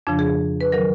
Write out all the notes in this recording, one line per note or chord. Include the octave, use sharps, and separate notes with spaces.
F2 C#3 F3 D4
G#4
B4
D#3 F#3 A#4